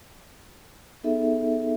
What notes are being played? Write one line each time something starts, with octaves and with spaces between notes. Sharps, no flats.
B3 D#4 G#4 A4 E5